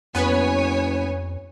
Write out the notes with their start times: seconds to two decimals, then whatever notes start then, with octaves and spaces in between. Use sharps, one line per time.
0.15 F#1 F2 B3 B4 C#5 G#5